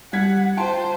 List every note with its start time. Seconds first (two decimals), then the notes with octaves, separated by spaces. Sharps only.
0.13 G3 F#5 G#6 B6
0.57 F4 C5 G5 A5 C6